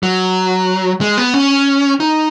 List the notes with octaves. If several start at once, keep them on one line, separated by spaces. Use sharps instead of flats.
F#3
G#3
B3
C#4
D#4